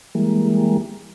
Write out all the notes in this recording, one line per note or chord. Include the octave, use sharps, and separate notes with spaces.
E3 G3 G#3 A#3